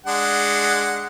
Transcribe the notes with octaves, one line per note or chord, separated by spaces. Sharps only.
G#3 D4 F#5